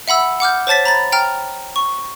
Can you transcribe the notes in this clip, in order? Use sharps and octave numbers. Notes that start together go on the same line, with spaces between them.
E5 F#5 B5 E6
F#5 D6 F6 G6
C5 C#5 A5 A6 B6
A#5 B5 A6
G5 A#5 F6
C#6